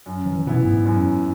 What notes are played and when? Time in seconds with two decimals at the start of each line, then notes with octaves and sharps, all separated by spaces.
0.06 F#2
0.26 E3
0.46 B2 E3 B3 E4
0.65 G#2
0.85 F#2